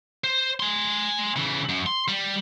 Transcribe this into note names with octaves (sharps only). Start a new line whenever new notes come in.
C5
G#5 C6
C#3 E3
F#2
C6
G3